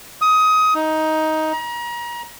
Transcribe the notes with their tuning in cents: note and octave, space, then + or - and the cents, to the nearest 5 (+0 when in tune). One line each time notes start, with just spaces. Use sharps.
D#6 +20
D#4 +10
A#5 +35